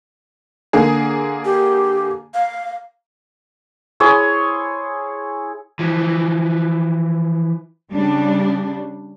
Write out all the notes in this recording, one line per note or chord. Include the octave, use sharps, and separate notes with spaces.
D3 A#3 G#4
G4
F5
E4 G#4 C#5 C6
E3 F3
C#3 G3 D4